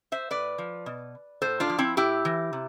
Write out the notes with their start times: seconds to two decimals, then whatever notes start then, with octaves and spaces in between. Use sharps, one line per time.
0.12 C5 E5
0.30 A2 B4 D5
0.58 F3
0.86 B2
1.42 A2 A4 C5
1.60 D4 F4
1.70 F3
1.78 C4 E4
1.97 A2 E4 G4
2.25 E3
2.53 C3